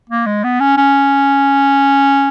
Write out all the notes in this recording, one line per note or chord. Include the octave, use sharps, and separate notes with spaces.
A#3
G#3
B3
C#4
C#4